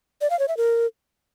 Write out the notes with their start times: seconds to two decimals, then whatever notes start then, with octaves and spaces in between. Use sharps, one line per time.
0.21 D5
0.30 F5
0.39 C#5
0.48 E5
0.57 A#4